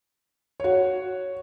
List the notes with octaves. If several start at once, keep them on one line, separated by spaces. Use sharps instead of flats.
F#4 C#5